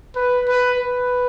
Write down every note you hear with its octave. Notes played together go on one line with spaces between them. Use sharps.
B4
B4
B4